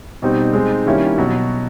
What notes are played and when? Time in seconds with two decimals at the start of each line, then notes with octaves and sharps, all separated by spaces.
0.22 B2 G3 C4 D#4
0.53 G#3 C4 D#4
0.86 D#3 G3 A#3 C#4 E4
1.18 B2 F#3